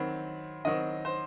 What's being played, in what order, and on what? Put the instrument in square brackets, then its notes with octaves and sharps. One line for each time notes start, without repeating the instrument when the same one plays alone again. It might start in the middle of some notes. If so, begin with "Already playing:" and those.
Already playing: [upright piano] D#3 F#3 C4 B5
D#3 F#3 C4 D#5
C5